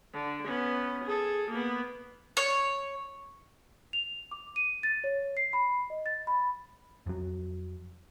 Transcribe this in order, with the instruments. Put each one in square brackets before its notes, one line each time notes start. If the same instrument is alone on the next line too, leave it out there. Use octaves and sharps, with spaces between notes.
[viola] D3
B3 C#4
G#4 A4
A#3 B3
[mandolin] C#5
[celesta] F7
D6
D#7
A6
C#5
C7
B5
D#5
A6
B5
[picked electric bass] F2 F#3